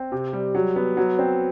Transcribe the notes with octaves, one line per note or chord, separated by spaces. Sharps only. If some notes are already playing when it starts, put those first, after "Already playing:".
Already playing: C4
C3
G3
F#3
B3
F#3
C4